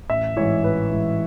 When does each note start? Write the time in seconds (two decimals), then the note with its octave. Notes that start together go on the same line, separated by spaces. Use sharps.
0.10 A1 E5
0.37 G#2 E3 C#5
0.64 A1 B4
0.91 G#2 E3